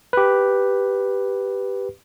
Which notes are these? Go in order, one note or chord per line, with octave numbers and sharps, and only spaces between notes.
G4 B4